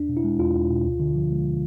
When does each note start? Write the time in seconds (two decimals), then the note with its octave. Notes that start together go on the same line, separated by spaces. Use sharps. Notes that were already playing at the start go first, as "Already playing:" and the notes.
Already playing: E2 D4
0.09 B2
0.17 E4
0.24 G#3
0.39 E2 F4
0.54 E2
0.70 B2
0.85 D2
1.00 D3
1.15 F3
1.30 G#3